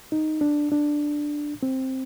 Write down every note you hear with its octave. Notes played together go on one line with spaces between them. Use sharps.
D#4
D4
D4
C4